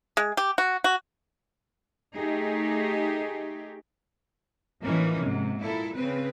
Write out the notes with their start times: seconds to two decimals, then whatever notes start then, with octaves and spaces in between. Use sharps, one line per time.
0.17 G#3
0.37 G4
0.58 F#4
0.84 F#4
2.16 A3 D#4 G4 G#4
4.82 A2 E3 F3 A#3 C#4 D#4
5.20 G#2 C3
5.61 A#2 E4 A4
5.95 C#3 C4 B4